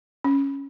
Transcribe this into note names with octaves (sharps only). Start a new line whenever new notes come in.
C#4